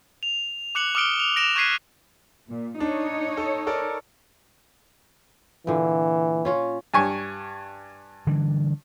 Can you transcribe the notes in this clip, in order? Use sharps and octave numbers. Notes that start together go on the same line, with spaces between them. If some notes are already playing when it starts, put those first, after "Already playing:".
F7
D6 F#6 C#7 F#7
D6 D#6 F6 C#7 D7 G7
F7
A#6 D7 E7 F7
C#6 F#6 G#6 B6 C7 D#7
A#2
D4 D#4 C#5
A4
A4 A#4 D5
A#2 D3 E3
C#4 F4 C#5
G2 G#5 C#6
D3 E3 G3